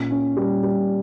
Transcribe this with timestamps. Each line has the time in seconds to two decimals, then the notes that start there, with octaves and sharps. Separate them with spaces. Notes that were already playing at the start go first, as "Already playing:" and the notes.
Already playing: A#2 C#4
0.11 C#4
0.37 G3
0.63 G3